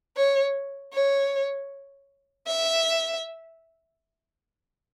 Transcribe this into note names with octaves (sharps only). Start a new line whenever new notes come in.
C#5
C#5
E5